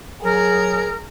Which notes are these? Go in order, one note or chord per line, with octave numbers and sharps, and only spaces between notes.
F#3 G#4 A#4